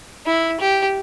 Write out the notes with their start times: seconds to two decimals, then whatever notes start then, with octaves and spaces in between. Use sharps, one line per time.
0.26 E4
0.60 G4